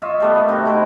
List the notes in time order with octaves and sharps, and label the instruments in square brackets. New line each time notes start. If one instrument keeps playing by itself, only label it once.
[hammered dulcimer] F4 C#5 D#5 E5
G3 A3 B3
A#2 B3
C3 D#4 F#4
A3 E4 B4 C5